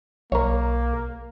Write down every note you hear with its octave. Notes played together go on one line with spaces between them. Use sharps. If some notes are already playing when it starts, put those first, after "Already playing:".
B1 A#3 A#4 C#5